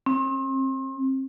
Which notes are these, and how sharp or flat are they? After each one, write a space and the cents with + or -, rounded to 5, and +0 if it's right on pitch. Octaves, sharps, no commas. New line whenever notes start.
C4 +35